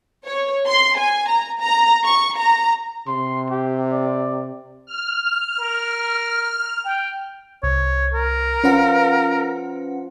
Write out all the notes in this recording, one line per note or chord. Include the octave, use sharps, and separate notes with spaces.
C#5
C6
G#5
A#5
A#5
C#6
A#5
C3 C6
G4
D5
F6
A#4
G5
C2 C#5
A#4
F3 C#4 B4 F#5